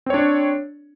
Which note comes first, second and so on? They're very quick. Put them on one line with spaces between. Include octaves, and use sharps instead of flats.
C4 C#5 D4